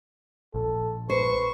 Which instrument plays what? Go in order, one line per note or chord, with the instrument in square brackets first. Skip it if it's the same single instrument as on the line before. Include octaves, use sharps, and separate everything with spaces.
[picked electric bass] A#1 [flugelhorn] A4
[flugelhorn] B4 [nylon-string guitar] C5 [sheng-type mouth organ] C#6